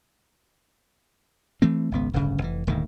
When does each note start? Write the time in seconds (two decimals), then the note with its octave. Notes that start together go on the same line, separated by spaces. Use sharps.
1.62 E3 A3 C4
1.91 G#1 C#2 B3
2.14 D1 G1 G2 C#3
2.42 F1 E3
2.67 D#1 D2 G#2 D#3